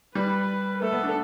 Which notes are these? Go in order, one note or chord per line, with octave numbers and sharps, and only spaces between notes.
G3 B4
A3 A4
B3
D4